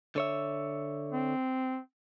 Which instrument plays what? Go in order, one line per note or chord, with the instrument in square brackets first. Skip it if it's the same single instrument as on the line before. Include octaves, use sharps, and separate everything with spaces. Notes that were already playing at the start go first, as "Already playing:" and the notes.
[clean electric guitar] D3 C#5 E5
[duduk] C4